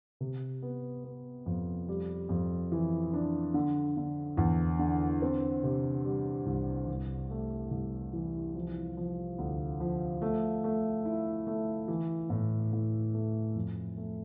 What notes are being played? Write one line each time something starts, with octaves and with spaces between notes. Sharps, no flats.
C3
B3
B3
F2
G3
F2
E3
D4
D3
D3
E2
D3
C4
C3
G3
C2
C2
A3
C2
E3
F3
F3
D2
F3
A3
A3
E4
A3
E3
A2
A2
A3
F2
A3